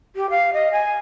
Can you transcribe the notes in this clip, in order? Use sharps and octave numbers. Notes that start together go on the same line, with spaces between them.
G4
F5
D#5
G#5